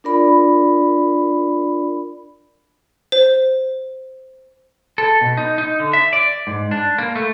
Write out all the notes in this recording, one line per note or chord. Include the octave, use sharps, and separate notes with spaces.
D4 F4 A#4 D5 B5
C5
A4
B2
D#4
D#4
D3
E5
D5
G#2
D4
A#3
A3